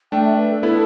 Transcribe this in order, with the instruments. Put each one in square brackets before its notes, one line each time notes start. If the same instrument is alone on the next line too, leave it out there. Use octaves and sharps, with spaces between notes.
[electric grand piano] A3 D4 [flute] G5
[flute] E5
B4
A4
[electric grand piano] B3 E4 [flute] A4